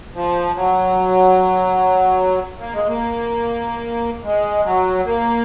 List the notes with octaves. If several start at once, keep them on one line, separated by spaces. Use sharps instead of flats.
F3
F#3
A#3
G#3
A#3
G#3
F#3
A#3